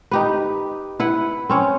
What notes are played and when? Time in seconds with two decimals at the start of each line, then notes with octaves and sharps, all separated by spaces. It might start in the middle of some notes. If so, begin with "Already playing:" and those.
0.11 D#4 G4 B4
1.00 E4 B4 F#5
1.50 C4 C#4 C#5